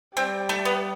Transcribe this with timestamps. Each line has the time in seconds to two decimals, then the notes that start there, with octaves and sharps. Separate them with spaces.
0.16 G3 C4
0.49 A3
0.65 B3